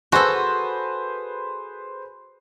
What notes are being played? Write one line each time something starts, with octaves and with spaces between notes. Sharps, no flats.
F#4 G#4 A4 B4 C5